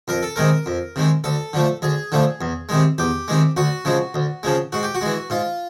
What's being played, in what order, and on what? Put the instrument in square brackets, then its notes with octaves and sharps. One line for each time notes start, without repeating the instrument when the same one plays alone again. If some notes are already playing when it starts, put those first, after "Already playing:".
[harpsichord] F2 A#4
A4
C3 D#3 G#3 A#4
F2
C3 D#3 G#3
D2 A4
D3 F3 A3
D2 G#4
D3 F3 A3
E2
C3 D#3 G#3
E2 G4
C3 D#3 G#3
D2 F#4
C#3 F3 G#3
D2
C#3 F3 G#3
G#2 F#4
G4
F#4
E3 G#3
G#2 F4